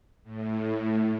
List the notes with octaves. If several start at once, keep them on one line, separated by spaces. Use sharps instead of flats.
A2